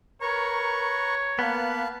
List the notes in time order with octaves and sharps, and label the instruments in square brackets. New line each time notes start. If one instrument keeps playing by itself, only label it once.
[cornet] A#4 [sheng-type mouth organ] B4 A#5 C#6 [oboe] C#5
[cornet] A#3 [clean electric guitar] B3 [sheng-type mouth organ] B4 F5 A5